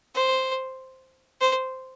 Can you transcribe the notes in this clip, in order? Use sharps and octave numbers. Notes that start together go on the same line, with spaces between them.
C5
C5